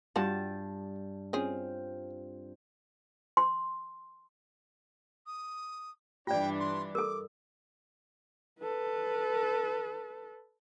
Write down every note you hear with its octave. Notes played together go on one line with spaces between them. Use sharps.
G2 F4 F#4 F#5 A5
C4 C#4 F4 G#4
C6
D#6
G2 E3 D4 F4 D5 G5
C6
A4 A#4 D6
A4 B4